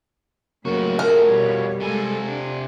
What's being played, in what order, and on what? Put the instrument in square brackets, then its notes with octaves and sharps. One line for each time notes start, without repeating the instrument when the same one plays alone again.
[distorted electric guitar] F2 F#4 [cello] A2 [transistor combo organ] C#3 F#3 A#3
[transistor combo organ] A3 G#4 [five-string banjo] A#4
[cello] B2 C#5 [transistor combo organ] G3
[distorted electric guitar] C3 G#5 [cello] G#3 A4
[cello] D4